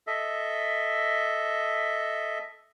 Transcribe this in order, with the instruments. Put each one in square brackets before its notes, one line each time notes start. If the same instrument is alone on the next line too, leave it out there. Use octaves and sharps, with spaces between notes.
[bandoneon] A4 D#5 E5